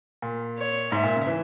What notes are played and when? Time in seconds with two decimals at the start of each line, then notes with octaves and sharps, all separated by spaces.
0.22 A#2
0.58 C#5
0.92 G#2 E5
1.04 A#2
1.16 C#3
1.27 E3